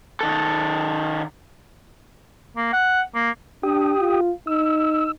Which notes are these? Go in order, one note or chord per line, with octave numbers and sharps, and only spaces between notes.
D#3 A4
A#3
F#5
A#3
D4 G4 G5 D#6
F4
D#4 E6